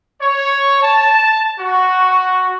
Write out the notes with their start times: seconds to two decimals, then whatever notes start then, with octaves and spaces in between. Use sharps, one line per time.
0.21 C#5
0.81 A5
1.59 F#4